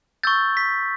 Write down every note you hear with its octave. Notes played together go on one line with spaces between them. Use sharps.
C#6 E6 G6 A6
B6